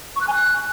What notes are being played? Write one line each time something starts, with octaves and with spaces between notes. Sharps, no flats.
C#6
F#6
G#5
F#6